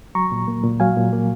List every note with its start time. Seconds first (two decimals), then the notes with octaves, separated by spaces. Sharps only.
0.15 F#3 A#5 C#6
0.32 A#2
0.48 A#3
0.64 A#2
0.80 F#3 F5 G#5
0.97 A#2
1.13 A#3